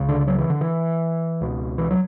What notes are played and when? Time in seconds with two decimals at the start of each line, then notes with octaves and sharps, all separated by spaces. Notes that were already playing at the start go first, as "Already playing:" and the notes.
Already playing: C#2 C#3
0.09 D3
0.27 F#3
0.39 E3
0.50 D3
0.61 E3
1.41 C#2 B2
1.78 E3
1.91 F#3